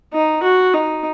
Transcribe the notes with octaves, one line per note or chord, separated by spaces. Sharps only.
D#4
F#4
D#4